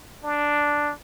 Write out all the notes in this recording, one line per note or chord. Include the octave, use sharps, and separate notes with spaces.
D4